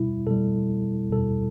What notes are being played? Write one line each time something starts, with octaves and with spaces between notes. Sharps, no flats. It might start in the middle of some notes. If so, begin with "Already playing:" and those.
Already playing: B2 G3 E4
B2 G3 A4
B2 G3 A4